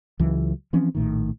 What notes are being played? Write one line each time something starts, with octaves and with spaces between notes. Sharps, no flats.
C#2 E3 F#3
E3 F3 C4 C#4
A#1 A2 D#3